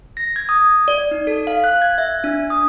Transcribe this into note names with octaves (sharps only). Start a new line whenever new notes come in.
A#6
G#6
D#6
D5
D#4
A4
F5
F#6
G#6
E5
D4
D#6